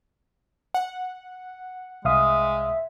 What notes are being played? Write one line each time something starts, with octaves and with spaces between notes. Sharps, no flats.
F#5
C2 G#3 E5 F5 D#6